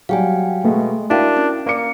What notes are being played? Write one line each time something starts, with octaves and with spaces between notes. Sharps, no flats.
F#3 G3 F5 G5 G#5
B2 G#3 A3
D4 E4 F#4 A#4 F5 G5
C#4
A#3 D5 D6 C#7